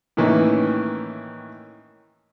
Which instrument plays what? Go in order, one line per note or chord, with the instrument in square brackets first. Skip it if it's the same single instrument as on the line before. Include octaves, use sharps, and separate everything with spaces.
[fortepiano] A2 D#3 E3 A#3 C#4